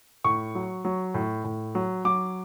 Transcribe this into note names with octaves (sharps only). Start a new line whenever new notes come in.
A2 C#6
F#3
F#3
A2
A2
F#3
F#3 D6